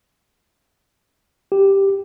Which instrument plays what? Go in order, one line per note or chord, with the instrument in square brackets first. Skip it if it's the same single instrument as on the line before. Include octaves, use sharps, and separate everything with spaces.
[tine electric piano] G4